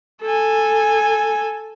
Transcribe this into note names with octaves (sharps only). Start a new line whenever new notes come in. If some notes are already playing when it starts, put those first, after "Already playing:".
A4 G#5